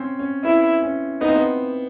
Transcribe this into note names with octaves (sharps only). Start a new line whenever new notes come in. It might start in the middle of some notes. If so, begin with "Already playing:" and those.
Already playing: C4 C#4
C#4
B3 E4
C#4
B3 D#4
C4
B3